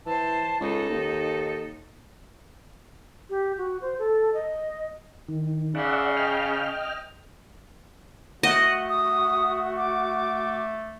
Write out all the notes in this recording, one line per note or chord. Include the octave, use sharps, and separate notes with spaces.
E3 C5 A5
C#2 D#4 A4
D#2
G4
F#4
C5
A4
D#5
D#3
C#3 D5 E5 F#5
D#5 G5 F6
A3 F#4 D#5 F#5
D#6
D6